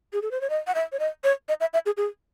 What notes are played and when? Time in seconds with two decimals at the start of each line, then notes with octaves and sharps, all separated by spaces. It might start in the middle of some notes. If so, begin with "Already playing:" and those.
0.13 G#4
0.22 A4
0.31 C5
0.41 C#5
0.50 D#5
0.67 F#5
0.75 E5
0.92 C#5
0.99 D#5
1.24 C#5
1.49 D#5
1.61 E5
1.74 E5
1.86 G#4
1.97 G#4